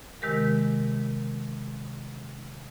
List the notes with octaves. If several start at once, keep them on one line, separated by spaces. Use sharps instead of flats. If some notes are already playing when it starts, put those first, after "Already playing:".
C3 D#3 G#3 G4 A#4